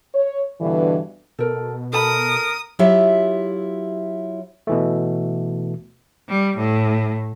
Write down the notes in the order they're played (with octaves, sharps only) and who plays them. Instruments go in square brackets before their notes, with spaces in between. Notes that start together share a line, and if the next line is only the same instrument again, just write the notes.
[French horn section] C#5
G2 B2 D3 E3
[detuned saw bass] B2 [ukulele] A4 A#4
[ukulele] A4 A5 B5 [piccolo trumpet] A#4 [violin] D#6
[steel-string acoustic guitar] F#3 E4 F4 G4 E5
[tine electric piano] B2 E3 A3
[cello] G3
A2